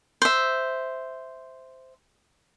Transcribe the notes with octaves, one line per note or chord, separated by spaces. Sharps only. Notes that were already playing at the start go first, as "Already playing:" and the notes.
C5 E5